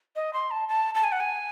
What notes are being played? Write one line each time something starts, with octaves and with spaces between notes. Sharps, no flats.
D#5
C6
A5
A5
A5
G#5
F#5
G#5